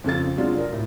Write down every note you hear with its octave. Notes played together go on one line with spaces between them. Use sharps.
F2 C#3 A4 A6
C3 F#3 G#3 D4 F4
A#4
A2